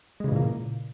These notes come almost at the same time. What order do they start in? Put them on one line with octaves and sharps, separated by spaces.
G#3 C#3 E3 A#2 A#3